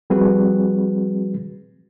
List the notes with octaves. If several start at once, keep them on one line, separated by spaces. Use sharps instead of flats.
F3 G3 C4 F#4 G#4 B4